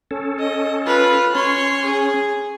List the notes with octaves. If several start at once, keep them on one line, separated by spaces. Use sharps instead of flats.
C#4 A4
D#5
F4 B4
C#4 C#5 C6
G#4